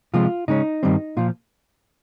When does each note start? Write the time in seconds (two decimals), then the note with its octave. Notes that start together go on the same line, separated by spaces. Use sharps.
0.14 C3 F3 G#3 F4
0.48 C#3 G#3 C#4 D#4
0.83 G2 D#3 G3 C4
1.17 A#2 F3 F4